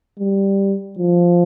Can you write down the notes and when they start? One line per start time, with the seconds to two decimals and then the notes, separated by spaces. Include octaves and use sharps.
0.19 G3
0.99 F3